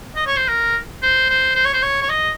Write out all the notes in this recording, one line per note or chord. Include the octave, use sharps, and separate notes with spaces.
D#5
C#5
C5
A#4
C5
C5
C5
C#5
C5
C#5
C#5
D#5